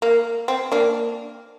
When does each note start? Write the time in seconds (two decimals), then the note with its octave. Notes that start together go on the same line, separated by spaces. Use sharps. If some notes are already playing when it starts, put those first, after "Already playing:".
0.02 A#3
0.48 C4
0.72 A#3 D4